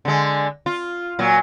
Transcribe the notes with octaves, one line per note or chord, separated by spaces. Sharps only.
D3 G#3
F4
A#2 F#3